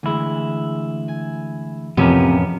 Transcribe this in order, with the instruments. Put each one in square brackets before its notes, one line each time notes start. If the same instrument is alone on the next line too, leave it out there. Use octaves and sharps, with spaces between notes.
[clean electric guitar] D2 E4 [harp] E3 G#3
[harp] G#5
[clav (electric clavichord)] A1 F2 [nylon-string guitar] C3 [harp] F3 [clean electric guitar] B3 C#4 A#4